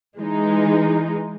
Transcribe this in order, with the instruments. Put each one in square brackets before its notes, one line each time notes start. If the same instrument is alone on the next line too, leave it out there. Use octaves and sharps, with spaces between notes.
[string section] E3 G#3 D#4